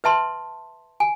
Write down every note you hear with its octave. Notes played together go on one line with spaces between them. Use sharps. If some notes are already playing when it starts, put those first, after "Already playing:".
B4 E5 A5 C6
G#5